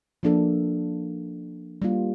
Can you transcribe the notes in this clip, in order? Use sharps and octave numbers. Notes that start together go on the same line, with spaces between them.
F3 A#3 D4 A4
G3 A#3 F4